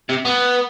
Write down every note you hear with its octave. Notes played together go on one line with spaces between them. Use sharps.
C3
B3